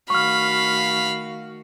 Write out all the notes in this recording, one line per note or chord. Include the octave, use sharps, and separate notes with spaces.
D#3 A3 F#4 F5 B5 C#6 F6